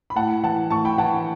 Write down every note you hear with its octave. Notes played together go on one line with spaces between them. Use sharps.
B5
A2 F#5 A5
E3 F#5 A5
A2 A5 C#6
G5 B5
E3 F#5 A5